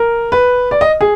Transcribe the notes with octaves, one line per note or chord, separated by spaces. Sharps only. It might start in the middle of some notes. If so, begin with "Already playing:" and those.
Already playing: A#4
B4
D5
D#5
G#4